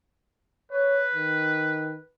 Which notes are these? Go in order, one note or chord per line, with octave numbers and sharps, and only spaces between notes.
B4 C#5
D#3